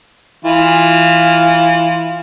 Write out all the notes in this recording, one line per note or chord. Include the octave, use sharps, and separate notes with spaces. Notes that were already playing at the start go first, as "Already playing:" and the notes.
E3 F4